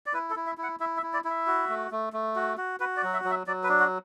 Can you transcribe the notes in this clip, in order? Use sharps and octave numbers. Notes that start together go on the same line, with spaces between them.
D5
E4 B4
A4
E4
E5
E4
F#5
E4 E5
E5
E4
D5
E4
E5
F#4
A3
A3
A3
F#4
F#4
F#4 B4
D5
F#3
E5
F#3
E5
F#3 D5
B4
D4
F#4